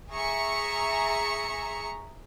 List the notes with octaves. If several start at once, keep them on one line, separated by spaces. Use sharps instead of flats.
G#4 E5 A#5 C#6 C#7